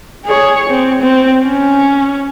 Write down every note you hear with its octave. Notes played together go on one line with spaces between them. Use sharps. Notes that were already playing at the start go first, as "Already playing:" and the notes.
G#4 C#5
C4
C4
C#4